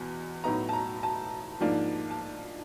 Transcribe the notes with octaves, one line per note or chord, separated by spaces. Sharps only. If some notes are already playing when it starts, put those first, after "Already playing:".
Already playing: E2 B2
A2 F#3 B3 D#4 A#5
A5
A#5
A5
G#2 F3 A#3 D4
A5